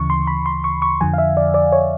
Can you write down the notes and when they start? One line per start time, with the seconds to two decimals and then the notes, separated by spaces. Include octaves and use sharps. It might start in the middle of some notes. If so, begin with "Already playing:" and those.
Already playing: D2 C#3 E3 C#6
0.10 C6
0.27 B5
0.46 C6
0.64 C#6
0.82 C#6
1.01 F2 D3 F3 G#5
1.14 F5
1.18 E5
1.37 D5
1.54 D5
1.72 C#5